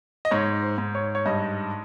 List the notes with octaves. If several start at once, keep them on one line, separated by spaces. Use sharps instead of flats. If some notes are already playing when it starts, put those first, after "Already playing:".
D#5
G#2 C#5
C5
G#2
C#5
C#5
G2 D#5